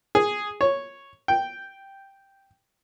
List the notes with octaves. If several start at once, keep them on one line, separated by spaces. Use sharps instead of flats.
G#4
C#5
G5